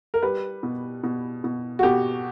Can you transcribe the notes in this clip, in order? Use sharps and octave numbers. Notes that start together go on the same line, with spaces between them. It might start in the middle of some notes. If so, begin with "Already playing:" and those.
A#4
G3 B4
B2
B2
B2
F#4
B2 G4